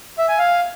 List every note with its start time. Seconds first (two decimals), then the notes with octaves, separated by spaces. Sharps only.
0.18 E5
0.28 G#5
0.39 F5